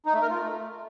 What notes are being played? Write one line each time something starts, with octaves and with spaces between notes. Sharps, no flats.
D#4
A3
A#4
F4
A3